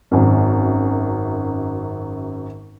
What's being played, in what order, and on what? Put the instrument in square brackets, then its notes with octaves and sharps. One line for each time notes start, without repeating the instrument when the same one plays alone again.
[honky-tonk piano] G#1 F#2